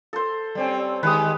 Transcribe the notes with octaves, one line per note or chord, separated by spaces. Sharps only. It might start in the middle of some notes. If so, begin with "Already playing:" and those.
A4 C5
G3 C4 C#4
D#3 G#3 G4 B4 D#6